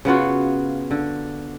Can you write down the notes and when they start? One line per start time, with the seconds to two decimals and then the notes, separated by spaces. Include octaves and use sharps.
0.05 C#3 B3 F4 F#4
0.91 D3